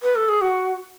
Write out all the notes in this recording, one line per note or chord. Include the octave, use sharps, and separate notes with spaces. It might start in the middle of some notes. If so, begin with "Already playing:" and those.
B4
A4
G#4
F#4